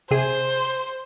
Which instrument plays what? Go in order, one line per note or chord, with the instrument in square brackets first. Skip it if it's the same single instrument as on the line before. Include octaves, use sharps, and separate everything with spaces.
[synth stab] C3 G#4 [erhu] C5